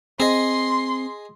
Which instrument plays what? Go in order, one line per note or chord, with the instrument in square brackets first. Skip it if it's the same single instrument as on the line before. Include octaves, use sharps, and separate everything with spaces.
[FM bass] C4 [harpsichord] G#4 D#5 [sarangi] C6